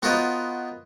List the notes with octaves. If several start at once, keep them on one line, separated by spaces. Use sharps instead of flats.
B3 F4 F#4 A#4 C5 D#5